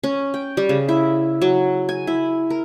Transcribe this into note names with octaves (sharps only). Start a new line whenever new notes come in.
C#4
G5
G3
C#3
E4
F#3
G#5
E4
A#4